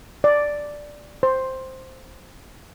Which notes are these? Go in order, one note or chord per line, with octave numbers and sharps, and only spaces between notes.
D5
C5